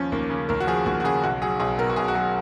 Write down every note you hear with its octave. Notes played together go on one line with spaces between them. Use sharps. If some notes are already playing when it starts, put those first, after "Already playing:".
Already playing: D#2 F3 C#4
D#2 A#3
C#3
D#2 A#4
F#4
F3 G#4
D#2 F#4
F#4
C#3 G#4
B1 F#4
F#3 G#4
B1 G#4
B2 A#4
F#4
B1 G#4
F#4
F#3 G#4